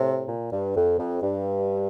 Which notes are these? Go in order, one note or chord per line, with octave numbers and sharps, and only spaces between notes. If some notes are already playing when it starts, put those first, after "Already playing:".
Already playing: A2 C3
A#2
G2
F2
F2
G2